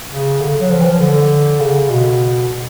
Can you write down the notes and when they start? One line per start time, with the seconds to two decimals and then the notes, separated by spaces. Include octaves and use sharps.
0.10 C#3
0.41 D3
0.61 F#3
0.71 F3
0.81 E3
0.86 F3
1.01 D3
1.60 C#3
1.90 B2